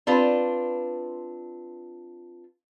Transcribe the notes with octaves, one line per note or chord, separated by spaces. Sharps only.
C4 D4 F4 B4